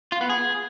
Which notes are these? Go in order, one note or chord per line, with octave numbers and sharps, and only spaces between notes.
F4
B3
G#4